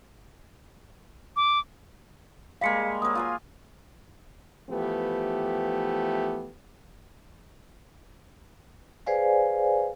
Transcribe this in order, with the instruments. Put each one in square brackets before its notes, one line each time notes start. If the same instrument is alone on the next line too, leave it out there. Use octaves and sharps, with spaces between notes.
[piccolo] D6
[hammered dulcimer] G3 G#3 A#3 [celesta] F5 B6 C#7
[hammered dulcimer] F#3 A#3 [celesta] D#6
[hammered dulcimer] F4 G#5 C6
[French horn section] E3 F3 A3 B3 G4
[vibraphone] G#4 B4 C5 D5 F5 G#5